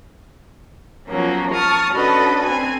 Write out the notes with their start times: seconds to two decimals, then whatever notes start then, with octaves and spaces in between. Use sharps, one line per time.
1.08 F3 F#3 A#3 B3 C#4
1.52 A5 C#6 D#6 F6
1.93 C#4 D4 F#4 A4 B4 D#5
2.45 C4 G#5